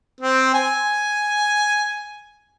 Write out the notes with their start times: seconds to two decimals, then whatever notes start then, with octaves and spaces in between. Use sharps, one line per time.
0.21 C4
0.54 G#5